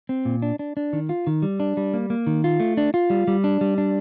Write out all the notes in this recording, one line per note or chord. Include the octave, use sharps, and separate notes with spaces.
C4
A#2
D4
D4
D4
D#3
F4
D#3
G3
D4
G3
A#3
A#3
D#3
F4
A3
D4
F4
G3
G3
D4
G3
D4